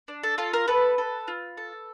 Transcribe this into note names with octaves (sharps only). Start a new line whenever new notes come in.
D4
A4
F4 A4
A#4
B3 A4 B4
A4
F4
A4